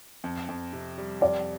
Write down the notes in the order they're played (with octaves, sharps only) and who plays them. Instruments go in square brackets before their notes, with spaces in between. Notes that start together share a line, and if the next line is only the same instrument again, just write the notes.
[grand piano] F2
F2
C3
G3
[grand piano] F2 [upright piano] D5